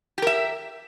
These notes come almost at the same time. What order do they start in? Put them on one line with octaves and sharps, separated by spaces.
G4 A#4 E5